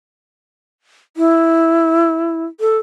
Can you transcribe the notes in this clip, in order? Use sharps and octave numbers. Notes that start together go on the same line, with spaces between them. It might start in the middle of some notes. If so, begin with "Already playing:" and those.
E4
A4